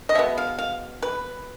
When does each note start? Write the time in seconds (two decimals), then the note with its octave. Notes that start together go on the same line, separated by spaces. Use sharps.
0.09 D#5
0.15 B2 G#3 B3 E5
0.38 F5
0.58 F5
1.02 B4